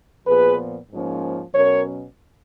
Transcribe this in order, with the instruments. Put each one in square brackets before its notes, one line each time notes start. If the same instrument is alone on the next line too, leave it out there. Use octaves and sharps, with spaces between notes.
[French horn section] A#2 F3 B3 G#4 B4
G#2 F3 A#3 C#4
B2 F#3 C#4 A#4 C#5